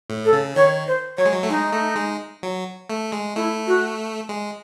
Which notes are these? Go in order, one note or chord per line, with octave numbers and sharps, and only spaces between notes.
A2
A4
C#3
D#3 C#5
C5
F#3 C#5
G#3
F#3
A3
G#3 D#4
A3
G#3
F#3
A3
G#3
A3 E4
F#4
G#3